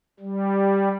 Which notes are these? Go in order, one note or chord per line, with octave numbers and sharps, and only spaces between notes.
G3